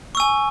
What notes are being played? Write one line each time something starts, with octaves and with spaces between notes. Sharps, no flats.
G#5 C#6 E6